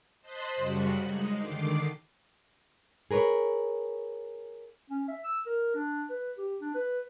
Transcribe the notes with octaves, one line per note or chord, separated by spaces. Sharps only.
C5 D#5 A5 C6 F#6 B6
F#2 C#3 G3 F#4 F#6
G#3 D#4
D3 D#3 D6 C7
G#4 A#4 B4 C#5
C#4
E5
E6
A#4
D4
B4
G4
D4
B4